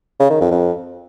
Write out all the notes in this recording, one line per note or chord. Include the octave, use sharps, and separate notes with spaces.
C#3
D#3
F2
F2